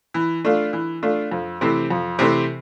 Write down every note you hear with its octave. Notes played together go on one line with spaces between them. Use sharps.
E3
A3 D4 F4
E3
A3 D4 F4
F2
C3 E3 A3 C4
F2
C3 E3 A3 C4